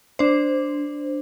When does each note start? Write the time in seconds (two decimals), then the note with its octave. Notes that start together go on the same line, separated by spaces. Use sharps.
0.19 D4 C5